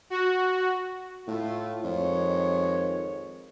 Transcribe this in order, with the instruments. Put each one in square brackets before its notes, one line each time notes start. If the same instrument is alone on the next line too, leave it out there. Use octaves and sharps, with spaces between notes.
[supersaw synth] F#4
[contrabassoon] A2 [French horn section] A3 F4
[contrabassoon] F2 [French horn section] D#3 G#3 C#5